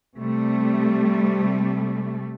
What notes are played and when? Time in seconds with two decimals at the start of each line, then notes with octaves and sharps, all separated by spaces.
0.18 C3 G3 A3